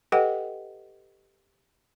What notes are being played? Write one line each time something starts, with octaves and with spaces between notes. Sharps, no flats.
G4 A4 B4 D#5 F#5 G5